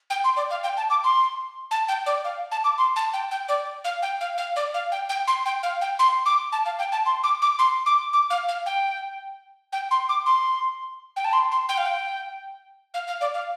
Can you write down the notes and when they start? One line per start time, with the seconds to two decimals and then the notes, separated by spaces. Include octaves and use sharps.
0.10 G5
0.24 C6
0.36 D5
0.50 F5
0.63 G5
0.77 A5
0.90 D6
1.04 C6
1.71 A5
1.88 G5
2.06 D5
2.24 F5
2.51 A5
2.64 D6
2.78 C6
2.96 A5
3.13 G5
3.31 G5
3.48 D5
3.84 F5
4.02 G5
4.21 F5
4.38 F5
4.56 D5
4.74 F5
4.92 G5
5.09 G5
5.27 C6
5.45 G5
5.63 F5
5.81 G5
5.99 C6
6.26 D6
6.52 A5
6.65 F5
6.79 G5
6.92 A5
7.06 C6
7.23 D6
7.42 D6
7.59 C6
7.86 D6
8.13 D6
8.30 F5
8.48 F5
8.66 G5
9.72 G5
9.91 C6
10.09 D6
10.26 C6
11.16 G5
11.24 A5
11.33 C6
11.51 C6
11.69 G5
11.77 F5
11.86 G5
12.94 F5
13.07 F5
13.21 D5
13.34 F5